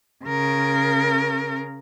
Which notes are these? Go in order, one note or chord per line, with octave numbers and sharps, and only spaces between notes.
C#3 A#4